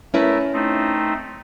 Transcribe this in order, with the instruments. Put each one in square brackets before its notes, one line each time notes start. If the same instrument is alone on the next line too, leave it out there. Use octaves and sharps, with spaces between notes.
[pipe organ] A3 A#4 [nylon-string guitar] C#4 E4 B4
[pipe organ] A3 C4 D#4